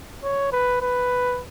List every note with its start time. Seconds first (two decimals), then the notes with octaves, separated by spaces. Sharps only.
0.24 C#5
0.53 B4
0.82 B4